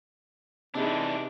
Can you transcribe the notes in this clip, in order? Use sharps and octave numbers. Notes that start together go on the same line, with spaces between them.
C3 E3 D4 D#4 G#4